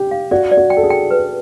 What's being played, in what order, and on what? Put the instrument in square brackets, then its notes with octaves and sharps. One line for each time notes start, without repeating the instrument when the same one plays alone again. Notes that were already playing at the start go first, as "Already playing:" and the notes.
Already playing: [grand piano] G4
[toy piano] F5
[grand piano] F#4 [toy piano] D5
[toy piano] D5
[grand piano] F#4
[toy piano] G5
[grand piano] A4
G#4
[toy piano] G5
B4